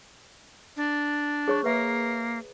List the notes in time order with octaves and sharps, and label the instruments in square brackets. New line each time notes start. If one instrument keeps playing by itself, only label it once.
[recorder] D4
[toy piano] G#4 C#5 C#6
[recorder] A#3 [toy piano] B4 E5